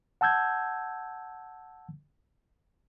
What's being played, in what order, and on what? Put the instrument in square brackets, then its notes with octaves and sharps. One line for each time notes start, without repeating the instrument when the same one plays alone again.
[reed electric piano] F#5 A5 E6 G6 G#6